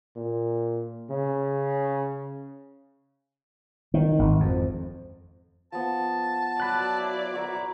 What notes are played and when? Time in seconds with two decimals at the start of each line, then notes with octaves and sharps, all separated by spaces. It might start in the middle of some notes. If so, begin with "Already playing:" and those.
0.16 A#2
1.10 C#3
3.94 D#3
4.19 G#1
4.40 F2
5.72 F3 B3 A5
6.60 F#3 D5 B5 F#6
7.00 E4
7.34 A#4 E5 C#6